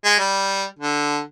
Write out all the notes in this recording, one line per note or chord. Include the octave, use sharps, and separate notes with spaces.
G#3
G3
D3